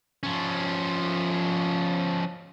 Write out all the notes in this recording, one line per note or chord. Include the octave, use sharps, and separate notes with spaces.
F3 C#4